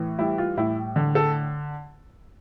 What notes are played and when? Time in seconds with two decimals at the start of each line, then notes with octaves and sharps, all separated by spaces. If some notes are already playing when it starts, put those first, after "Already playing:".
Already playing: A2 E3
0.19 G3 E4
0.38 F4
0.57 A2 E4
0.96 D3
1.15 A4